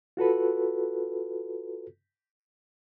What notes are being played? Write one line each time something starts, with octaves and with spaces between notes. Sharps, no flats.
F4 F#4 A4 B4